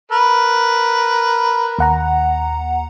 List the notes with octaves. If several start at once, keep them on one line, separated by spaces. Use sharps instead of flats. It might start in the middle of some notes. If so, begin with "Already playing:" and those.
A#4 B4
D#2 F#5 A#5